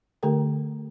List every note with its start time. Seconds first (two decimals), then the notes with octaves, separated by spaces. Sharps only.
0.23 D3 A3 G4 A4 A#4 G5